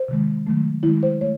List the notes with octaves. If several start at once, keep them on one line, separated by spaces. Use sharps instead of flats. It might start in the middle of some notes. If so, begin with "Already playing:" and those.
Already playing: C5
C3 D#3 G#3
D#3 F#3 A3
D#3 G#3 E4
C5
A3 C#5